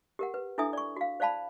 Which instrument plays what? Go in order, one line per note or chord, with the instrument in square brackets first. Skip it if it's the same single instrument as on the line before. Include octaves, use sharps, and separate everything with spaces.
[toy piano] G4 A#4 F#5
B4
D4 E4 A4 E5 G#5 D#6
D5 C#6
F#4 F5
C5 D5 F5 A5 B5